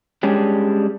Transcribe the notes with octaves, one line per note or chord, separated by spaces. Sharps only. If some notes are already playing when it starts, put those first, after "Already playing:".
G3 G#3 C#4 D4